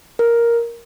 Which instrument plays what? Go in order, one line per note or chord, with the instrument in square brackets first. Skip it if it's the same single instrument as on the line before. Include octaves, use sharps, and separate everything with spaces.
[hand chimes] A#4